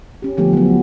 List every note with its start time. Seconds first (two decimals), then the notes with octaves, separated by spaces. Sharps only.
0.22 C#4 G4
0.37 D3 F3 A3 B3 G4
0.53 F#3 B3